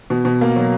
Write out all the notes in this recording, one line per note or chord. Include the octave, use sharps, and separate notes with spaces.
B2
B2
A#3
F#3